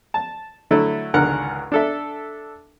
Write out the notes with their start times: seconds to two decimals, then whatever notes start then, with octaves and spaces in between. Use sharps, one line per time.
0.14 A5
0.71 D3 F#3 A3 E4
1.14 G#1 C#2 D3 A#4 F#5
1.72 D4 A4 E5